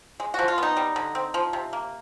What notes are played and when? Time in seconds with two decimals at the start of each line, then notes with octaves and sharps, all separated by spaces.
0.20 G#3
0.34 F3 F#4
0.48 F4
0.58 B3 D#4
0.77 G3
0.96 D3
1.15 C4
1.34 F3
1.53 C3
1.73 A#3